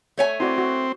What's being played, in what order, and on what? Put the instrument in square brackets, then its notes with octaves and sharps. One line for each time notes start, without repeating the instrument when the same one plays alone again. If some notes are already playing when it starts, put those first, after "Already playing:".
[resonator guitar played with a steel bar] A3 C#5 G#5
[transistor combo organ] C4 [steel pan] E4 F#4 D5
[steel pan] F#4